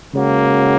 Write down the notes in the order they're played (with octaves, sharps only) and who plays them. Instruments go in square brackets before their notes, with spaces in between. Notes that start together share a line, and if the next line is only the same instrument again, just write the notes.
[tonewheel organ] C#3 G#3 C#4 F#4 [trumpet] A#3